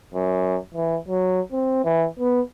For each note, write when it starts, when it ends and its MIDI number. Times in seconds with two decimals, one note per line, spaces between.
0.14 0.57 42
0.74 0.97 52
1.08 1.40 54
1.52 1.81 60
1.84 2.06 52
2.20 2.41 59